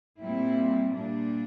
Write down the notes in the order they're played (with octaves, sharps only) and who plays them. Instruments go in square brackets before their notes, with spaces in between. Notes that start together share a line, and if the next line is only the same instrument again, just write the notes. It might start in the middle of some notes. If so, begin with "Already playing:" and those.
[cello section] A#2 G3 C4 E4
A#2 G3 D4